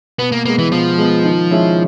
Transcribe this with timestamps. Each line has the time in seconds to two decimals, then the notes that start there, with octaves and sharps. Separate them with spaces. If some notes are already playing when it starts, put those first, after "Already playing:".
0.19 B2 B3
0.32 A#3
0.45 G#3 A#3 B3
0.59 E3
0.71 B2 F3
0.98 G#3 B3
1.24 D#3
1.51 G#3 C#4 E4